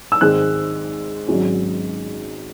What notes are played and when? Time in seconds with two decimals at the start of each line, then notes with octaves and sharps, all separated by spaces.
0.12 E6
0.21 G#2 D#3 G#3 C4 F#6
1.28 G#1 G#2 F#3 C#4